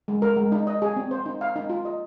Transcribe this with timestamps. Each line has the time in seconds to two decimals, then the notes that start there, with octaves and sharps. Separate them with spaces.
0.08 G#3
0.22 A#4
0.37 G#3
0.52 D#4
0.67 D#5
0.82 G#4
0.96 C4
1.11 C5
1.26 D#4
1.41 F5
1.56 D#4
1.70 F4
1.85 D#5